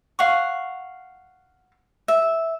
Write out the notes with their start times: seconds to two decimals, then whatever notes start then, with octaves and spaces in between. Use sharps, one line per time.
0.19 F5 F#5 C#6
2.08 E5